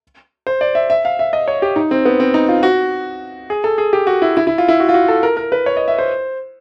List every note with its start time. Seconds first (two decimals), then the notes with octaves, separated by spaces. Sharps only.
0.47 C5
0.61 D5
0.75 E5
0.90 E5
1.05 F5
1.19 E5
1.33 D#5
1.48 C#5
1.62 G4
1.76 D#4
1.91 C4
2.05 B3
2.20 C4
2.34 D#4
2.49 F4
2.63 F#4
3.50 G#4
3.64 A4
3.78 G#4
3.93 G4
4.07 F#4
4.22 E4
4.37 E4
4.47 E4
4.58 F4
4.68 E4
4.80 F#4
4.89 F4
4.94 F#4
5.08 A4
5.23 A#4
5.37 A#4
5.52 B4
5.66 C#5
5.77 D#5
5.88 E5
5.99 C5